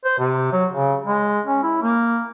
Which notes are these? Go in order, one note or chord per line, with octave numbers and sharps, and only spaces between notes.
C5
C3
F#3
C#3
G#3
C#4
E4
A#3